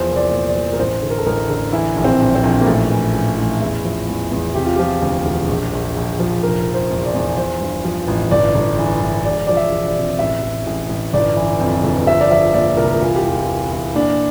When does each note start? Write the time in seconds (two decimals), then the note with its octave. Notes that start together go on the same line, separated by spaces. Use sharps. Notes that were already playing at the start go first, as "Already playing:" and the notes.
Already playing: E2 F3 C5
0.09 C2
0.16 D5
0.32 A#2
0.48 D5
0.55 F3
0.73 A#4
0.79 A1 C5
1.02 D3
1.10 A#4
1.18 A4
1.26 A1 A#4
1.49 D3
1.73 E3 E4
1.96 A#1
2.04 C4
2.20 A#1
2.35 C4
2.43 A#1
2.61 A#3
2.67 A1 A3
2.90 E3
3.14 A1
3.38 A1
3.61 E2 E4
3.85 F3
4.08 E2
4.32 E2
4.55 C3 G4
4.65 F4
4.76 F3 G4
5.02 D2
5.25 E1
5.49 A#1
5.73 A#1
5.96 A#1
6.20 F3
6.43 F1 A#4
6.66 F1
6.74 C5
6.91 E2
7.06 D5
7.14 E2
7.37 F3 C5
7.60 G2
7.85 F3
8.08 A1
8.31 G1 D5
8.54 G1
8.78 E3
9.02 G1
9.25 E1 D5
9.47 F3 D5
9.57 E5
9.72 E1
9.88 D5
9.96 C3
10.19 A1 E5
10.43 A1
10.66 A1
10.89 A1
11.13 G1 D5
11.37 E3
11.60 F2
11.83 G1
12.07 F3 E5
12.21 D5
12.31 F3 E5
12.54 A#2 D5
12.77 C2 A#4
13.01 E3 F4
13.15 G4
13.25 E2 F4
13.49 E3
13.72 E3
13.95 A#2 D4